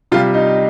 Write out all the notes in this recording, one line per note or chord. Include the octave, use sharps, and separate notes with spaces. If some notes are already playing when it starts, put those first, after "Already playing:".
C3 G3 F4
D#4